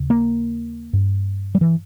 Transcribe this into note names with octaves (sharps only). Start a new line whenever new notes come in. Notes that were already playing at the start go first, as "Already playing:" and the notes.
Already playing: D#2 C#3
A#3
G2
G3
E3